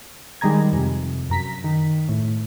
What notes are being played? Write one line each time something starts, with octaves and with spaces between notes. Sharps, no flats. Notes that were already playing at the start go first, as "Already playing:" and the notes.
D#3 G3 G#3 G#4 A#5 G#6
F2 C3
F#2 A#5 B6
D#3
A2